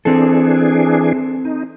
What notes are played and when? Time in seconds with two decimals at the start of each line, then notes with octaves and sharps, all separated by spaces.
0.05 E3 C4 D4 G#4 A4
1.45 D#4